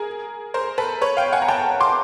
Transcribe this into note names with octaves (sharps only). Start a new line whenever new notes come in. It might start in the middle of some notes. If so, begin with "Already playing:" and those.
Already playing: G#4 A#4
A#4 C5
A4 B4
B4 C#5
F5 G5
F#5 G#5
A#5
G5 A5
C6 D6